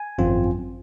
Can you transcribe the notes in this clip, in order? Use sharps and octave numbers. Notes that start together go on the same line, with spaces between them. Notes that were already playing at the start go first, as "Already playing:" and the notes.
Already playing: G#5
G#1 F#2 F3 C4 F4